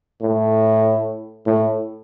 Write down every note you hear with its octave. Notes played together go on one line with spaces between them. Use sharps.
A2
A2